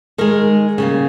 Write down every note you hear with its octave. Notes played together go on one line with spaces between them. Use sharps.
D#3 G#3 A#4
C#3 G3 A#3